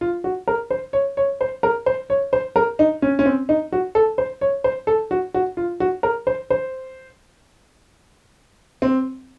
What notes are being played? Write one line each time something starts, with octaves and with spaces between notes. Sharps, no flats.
F4
F#4
A#4
C5
C#5
C#5
C5
A#4
C5
C#5
C5
A#4
D#4
C#4
C#4
C4
D#4
F#4
A4
C5
C#5
C5
A4
F#4
F#4
F4
F#4
A#4
C5
C5
C4